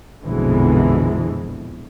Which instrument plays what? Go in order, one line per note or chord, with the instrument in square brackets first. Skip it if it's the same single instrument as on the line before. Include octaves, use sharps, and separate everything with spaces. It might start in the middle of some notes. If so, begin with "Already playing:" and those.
[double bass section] A#1 F2 B2 D3 E3 G#3